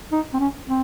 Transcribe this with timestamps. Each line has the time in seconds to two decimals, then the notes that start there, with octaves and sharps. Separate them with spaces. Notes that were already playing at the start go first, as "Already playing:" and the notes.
0.12 D#4
0.33 C4
0.39 C#4
0.67 C4